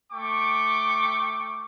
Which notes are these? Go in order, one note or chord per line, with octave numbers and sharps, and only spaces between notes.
A3 G5 C#6 D6